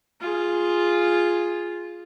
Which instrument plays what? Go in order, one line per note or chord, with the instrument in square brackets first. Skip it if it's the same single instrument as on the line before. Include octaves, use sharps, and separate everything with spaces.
[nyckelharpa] F4 G#4